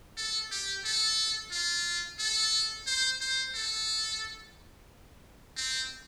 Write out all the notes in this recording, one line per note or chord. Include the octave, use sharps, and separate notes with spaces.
A4
G4
A4
F4
A4
C5
C5
A4
C4